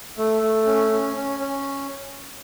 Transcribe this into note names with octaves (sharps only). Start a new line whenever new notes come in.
A3
A3
C#4
C#4
C#4
C#4